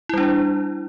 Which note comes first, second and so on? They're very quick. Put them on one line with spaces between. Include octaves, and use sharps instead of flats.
E4 G3 D4